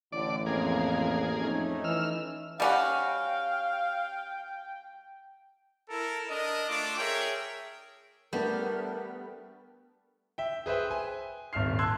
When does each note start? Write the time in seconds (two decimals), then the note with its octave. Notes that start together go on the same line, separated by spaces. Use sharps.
0.12 A1 A2 D3 D5
0.46 F2 A#3 G#4
1.39 F2 A3 C#4 D#4
1.84 E3 E6 F6
2.60 G3 C#4 F#4 F5 G5
5.89 E4 A4 A#4
6.28 D4 A#4 D#5
6.68 A3 D4 F4 D6
6.98 G#4 A#4 C#5 E5 G5
8.33 G3 A3 B3 D4 A#4
10.38 E5 G5
10.66 G#4 B4 C5 E5 G5
10.91 G#5
11.53 D#1 G#1 E5 F6 C7
11.79 A5 C6 E6 F#6 G#6